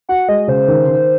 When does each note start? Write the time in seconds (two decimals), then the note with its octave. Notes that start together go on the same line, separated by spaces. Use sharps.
0.09 F#4 F#5
0.28 G#3 D#5
0.48 C#3 C5
0.68 D#3
0.88 D#3